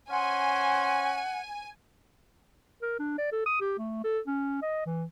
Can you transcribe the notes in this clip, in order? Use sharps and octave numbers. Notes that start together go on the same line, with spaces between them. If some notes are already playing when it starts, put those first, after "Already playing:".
C#4 C5 F#5 G#5
A#4
D4
D5
A4
D#6
G4
A3
A4
C#4
D#5
E3